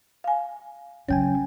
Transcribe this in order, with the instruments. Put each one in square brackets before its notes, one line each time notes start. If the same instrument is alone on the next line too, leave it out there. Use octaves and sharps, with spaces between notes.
[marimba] F5 G#5
[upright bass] C#3 F#3 [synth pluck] C#4 G5 G#5